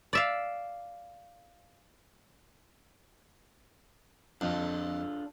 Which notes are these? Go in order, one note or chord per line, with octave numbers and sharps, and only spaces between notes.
D5 E5 F5
F2 D4 F4 A4